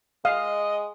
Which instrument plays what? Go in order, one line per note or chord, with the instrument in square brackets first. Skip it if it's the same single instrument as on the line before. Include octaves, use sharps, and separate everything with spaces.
[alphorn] G#3 [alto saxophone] D#5 [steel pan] F5